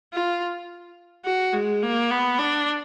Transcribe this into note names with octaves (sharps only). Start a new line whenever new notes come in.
F4
F#4
G#3
A#3
B3
D4